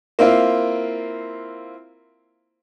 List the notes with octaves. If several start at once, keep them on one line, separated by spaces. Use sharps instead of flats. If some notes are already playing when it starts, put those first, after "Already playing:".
A#3 C4 E4 F4